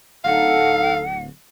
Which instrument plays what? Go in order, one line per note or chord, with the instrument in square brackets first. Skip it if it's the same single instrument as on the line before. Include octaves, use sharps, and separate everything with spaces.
[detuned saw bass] D1 [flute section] D#4 A4 [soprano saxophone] F5 [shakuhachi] F#5